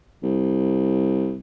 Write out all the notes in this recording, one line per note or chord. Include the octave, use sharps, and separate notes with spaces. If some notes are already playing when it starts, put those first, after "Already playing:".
C2